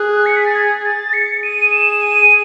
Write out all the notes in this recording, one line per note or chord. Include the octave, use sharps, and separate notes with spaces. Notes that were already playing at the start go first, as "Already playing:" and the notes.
Already playing: G#4 F#6
C#7
B6
A6
G#6
A6
C#7
G#4 D#7
E7
D#7